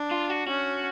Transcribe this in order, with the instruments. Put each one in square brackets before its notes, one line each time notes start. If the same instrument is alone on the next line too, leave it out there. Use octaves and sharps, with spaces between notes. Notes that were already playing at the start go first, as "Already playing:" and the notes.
Already playing: [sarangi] D4
[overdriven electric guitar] F4
F#4
[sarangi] C#4 [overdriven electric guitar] F#4